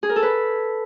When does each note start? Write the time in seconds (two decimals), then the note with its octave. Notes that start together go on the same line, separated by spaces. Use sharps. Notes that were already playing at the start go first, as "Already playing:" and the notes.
0.03 G#4
0.09 A#4
0.16 A4
0.23 B4